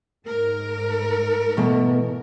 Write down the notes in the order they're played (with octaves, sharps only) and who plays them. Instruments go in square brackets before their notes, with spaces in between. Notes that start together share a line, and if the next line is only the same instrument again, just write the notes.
[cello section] G#2 A#4
[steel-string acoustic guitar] B2 E3 A3